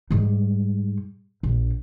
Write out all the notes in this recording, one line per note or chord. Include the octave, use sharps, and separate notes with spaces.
G#2 G3
A#1